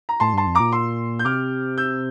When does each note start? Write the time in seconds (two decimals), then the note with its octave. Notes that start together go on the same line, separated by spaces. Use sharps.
0.09 A#5
0.20 A2 A5 C6
0.33 G2 A5 C6
0.47 F2
0.55 A#2 A#5 D6
0.72 C6 E6
1.19 G6
1.25 C3 D6 F6
1.78 E6 G6